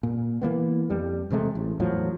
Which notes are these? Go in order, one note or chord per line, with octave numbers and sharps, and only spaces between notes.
A#2
E3 F3 A#3 B3
F2 G3
E1 C3 G#3 A3
A1
E2 A2 F3 F#3